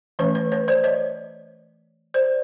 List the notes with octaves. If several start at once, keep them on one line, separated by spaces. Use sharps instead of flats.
E3 A3 C#4 B4 C#5
B4 C#5
B4 C#5
C5 D5
C#5 D#5
C5 D5